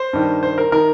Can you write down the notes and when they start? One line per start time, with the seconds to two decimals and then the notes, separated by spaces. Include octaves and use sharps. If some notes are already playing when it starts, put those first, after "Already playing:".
Already playing: C5
0.13 G2 D#3
0.43 C5
0.58 A#4
0.72 D#3 A#4